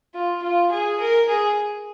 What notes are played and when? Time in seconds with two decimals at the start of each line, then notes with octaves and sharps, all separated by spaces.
0.15 F4
0.42 F4
0.72 G#4
1.00 A#4
1.29 G#4